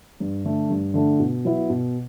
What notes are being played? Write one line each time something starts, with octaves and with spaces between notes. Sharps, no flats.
G2
D3 A3 D4
G2
D3 A3 D4
B2
F#3 B3 E4
B2